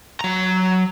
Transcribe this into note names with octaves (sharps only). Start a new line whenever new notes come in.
F#3 A#5